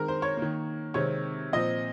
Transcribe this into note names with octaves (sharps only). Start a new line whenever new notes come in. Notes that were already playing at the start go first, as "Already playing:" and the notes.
Already playing: D#3 G#3 C4 A#4
C5
C#5
D#3 A#3
C3 D#3 G#3 C4 C#5
A#2 F3 C4 D#5